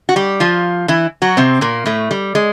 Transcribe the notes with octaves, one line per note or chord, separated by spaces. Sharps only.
F#4
G3 G4
F3 F4
E3 E4
F#3 F#4
C3 C4
A#2 A#3
A2 A3
G3
G#3